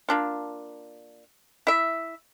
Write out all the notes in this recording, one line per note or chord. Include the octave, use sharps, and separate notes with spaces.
A#3 D4 F4
E4 E5